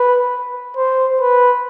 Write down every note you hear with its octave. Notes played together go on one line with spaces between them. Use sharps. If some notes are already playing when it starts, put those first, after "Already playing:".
Already playing: B4
C5
B4